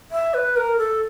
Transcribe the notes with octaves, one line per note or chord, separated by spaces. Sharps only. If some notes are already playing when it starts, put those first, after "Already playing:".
E5
B4
A#4
A4